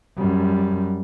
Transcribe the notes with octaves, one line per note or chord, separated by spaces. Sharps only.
F#2 G3